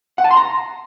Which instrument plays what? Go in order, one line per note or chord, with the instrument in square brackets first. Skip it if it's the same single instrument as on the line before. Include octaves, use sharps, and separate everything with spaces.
[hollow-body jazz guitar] F#5
A5
C6
A#5